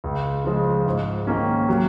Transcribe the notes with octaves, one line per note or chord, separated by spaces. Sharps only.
C#2
C#3 F3 G#3
G#2
D#3 A#3 C#4
F#3